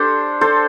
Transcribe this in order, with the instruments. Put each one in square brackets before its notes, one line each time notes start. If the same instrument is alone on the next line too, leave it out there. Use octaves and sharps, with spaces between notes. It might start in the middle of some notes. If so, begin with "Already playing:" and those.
Already playing: [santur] D4 G4 A4 C5
A4 C5